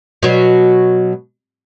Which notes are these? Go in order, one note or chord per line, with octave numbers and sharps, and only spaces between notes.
B2 F#3